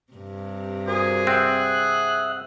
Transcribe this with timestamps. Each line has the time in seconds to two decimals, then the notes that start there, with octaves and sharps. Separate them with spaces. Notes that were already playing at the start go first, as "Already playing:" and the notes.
0.13 G2 C3
0.88 F#4 G#4 A#4 C5
1.27 C4 E5 F#5 F#6